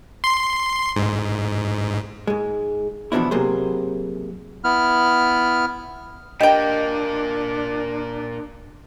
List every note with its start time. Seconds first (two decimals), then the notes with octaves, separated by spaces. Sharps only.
0.24 C6
0.96 G#2
2.27 G#2 G#3
3.12 B2 E3 F3 B3 D4 E4
3.31 C3 F#3 A#3 G#4 C5
4.64 B3 E4 F6
6.41 A#2 A#3 D4 G4 D#5 G5